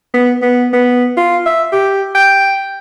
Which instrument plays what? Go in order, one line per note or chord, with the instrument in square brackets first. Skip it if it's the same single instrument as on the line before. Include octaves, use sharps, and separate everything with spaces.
[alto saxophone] B3
B3
B3
F4
E5
G4
G5